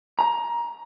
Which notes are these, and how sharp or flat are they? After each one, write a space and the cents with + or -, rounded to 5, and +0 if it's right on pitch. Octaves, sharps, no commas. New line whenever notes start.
A#5 +20